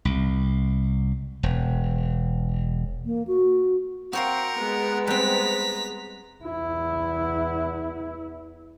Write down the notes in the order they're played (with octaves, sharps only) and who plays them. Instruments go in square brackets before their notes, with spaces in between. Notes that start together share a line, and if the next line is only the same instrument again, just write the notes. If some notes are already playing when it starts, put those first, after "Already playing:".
[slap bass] C2
E1
[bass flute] A#3
F#4
[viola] C4 [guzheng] F#4 C#5 F5 [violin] A#4 C#7
[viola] G#3 B3
[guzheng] G3 C4 [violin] A#5 B6
[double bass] E2 E4